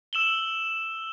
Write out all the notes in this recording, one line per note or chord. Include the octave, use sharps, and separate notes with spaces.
E6 E7 F#7 G7